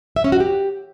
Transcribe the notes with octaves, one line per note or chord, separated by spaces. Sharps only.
E5
C#4
F#4
G4